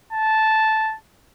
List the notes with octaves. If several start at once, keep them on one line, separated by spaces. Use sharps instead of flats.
A5